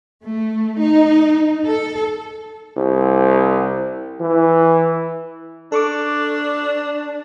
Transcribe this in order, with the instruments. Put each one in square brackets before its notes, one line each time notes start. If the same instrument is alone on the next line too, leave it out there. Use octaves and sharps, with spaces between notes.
[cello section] A3
D#4
A4
[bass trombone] C2
E3
[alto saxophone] D4 [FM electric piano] A4 C#6 D6